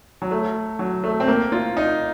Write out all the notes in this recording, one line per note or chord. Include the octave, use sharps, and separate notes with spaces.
F#3
A3
F#3
A3
C4
A#3
F4
D#4